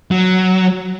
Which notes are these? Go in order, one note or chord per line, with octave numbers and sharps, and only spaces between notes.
F#3